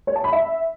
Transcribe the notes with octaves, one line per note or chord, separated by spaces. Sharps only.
C#5
A5
B5
E5